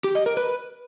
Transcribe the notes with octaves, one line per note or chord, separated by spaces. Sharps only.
G4
D#5
A#4
B4